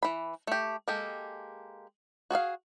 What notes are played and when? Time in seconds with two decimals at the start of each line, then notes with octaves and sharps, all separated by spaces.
0.03 E3 B5
0.47 A3 G4
0.88 G#3 A#3 G4 A4
2.31 F#4 G#4 A4 F5